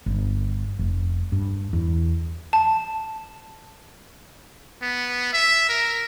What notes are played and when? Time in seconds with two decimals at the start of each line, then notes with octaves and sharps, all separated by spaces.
0.06 G1
0.79 F1
1.32 G2
1.73 E2
2.53 A5
4.81 B3
5.33 E5
5.69 A#4